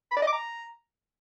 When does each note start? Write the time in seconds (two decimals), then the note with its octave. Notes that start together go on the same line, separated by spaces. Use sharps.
0.11 B5
0.17 D5
0.22 D#5
0.27 D6
0.33 A#5